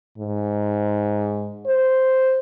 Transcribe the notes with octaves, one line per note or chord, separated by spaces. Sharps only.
G#2
C5